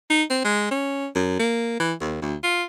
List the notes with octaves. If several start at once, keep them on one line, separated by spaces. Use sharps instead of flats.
D#4
C4
G#3
C#4
F#2
A#3
E3
D#2
D2
F4